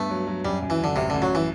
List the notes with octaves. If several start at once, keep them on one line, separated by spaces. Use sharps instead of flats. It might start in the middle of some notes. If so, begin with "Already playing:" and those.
Already playing: G2 A3 B3
F#3
F#3
F#2 G3
F#2
E3
F#2 D3
A1 C3
A1 D3
F#3
E3